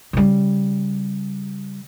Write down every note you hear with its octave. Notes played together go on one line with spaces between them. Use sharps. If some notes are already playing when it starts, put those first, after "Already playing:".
C#3 G3